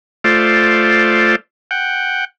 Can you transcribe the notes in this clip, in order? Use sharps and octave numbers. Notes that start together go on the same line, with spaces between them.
A3 F4 C5 D5
F#5 G5